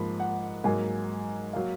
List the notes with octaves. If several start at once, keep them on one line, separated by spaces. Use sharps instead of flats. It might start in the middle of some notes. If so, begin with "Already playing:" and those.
Already playing: G#2 F3 A#3 B5
F#5
G#2 F#3 A#3 G#5
F#3 A#3 F5